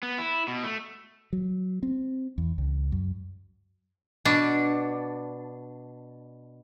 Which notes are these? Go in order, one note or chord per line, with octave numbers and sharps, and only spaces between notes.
B3
E4
B2
A3
F#3
C4
E2
C#2
F#2
B2 D4